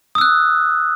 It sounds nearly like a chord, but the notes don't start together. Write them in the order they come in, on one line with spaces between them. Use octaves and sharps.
D#6 E6 F#6